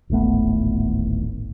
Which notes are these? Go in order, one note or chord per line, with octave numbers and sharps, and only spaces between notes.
D1 G#1 A3 B3